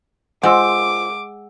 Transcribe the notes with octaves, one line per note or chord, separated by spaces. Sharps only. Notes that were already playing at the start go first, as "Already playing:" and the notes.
G#3 F4 C5 F#5 D6 E6